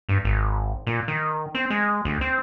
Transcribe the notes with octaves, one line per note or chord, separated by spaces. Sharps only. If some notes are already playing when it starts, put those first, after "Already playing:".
G2
G#1
A#2
D#3
C4
G#3
D2
C4